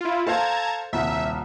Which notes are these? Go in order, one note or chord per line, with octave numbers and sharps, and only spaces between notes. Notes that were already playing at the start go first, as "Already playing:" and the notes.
E4 F4
A4 C5 F5 A5 A#5 G#6
D#1 C2 E5